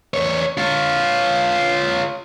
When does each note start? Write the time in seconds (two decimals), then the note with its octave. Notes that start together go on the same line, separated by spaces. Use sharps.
0.14 E2 C#5
0.58 F4 C#5